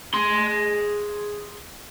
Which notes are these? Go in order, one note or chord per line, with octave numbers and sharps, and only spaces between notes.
G#4 C6